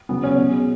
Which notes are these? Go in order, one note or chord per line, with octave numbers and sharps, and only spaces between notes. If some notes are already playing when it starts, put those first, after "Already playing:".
C#3 F#3 B3
C#4
B2 G#3